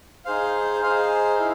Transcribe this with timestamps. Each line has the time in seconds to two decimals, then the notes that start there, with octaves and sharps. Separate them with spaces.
0.25 D#4 G#4 C5 F5
0.82 D#4 G#4 C5 F5
1.39 E4